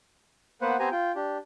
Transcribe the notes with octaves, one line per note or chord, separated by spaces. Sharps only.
A#3 B3 B4 C5 F#5
B3 C4 G4 C5 G#5 A#5
F4 G5
D4 G4